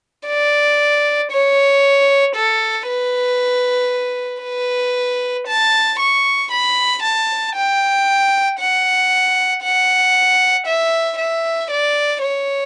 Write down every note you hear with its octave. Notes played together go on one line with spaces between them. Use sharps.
D5
C#5
A4
B4
B4
A5
C#6
B5
A5
G5
F#5
F#5
E5
E5
D5
C#5